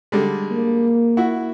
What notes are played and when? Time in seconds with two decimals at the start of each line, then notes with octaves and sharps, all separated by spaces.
0.12 D3 G3 G#3
0.51 A#3
1.17 E4 F#4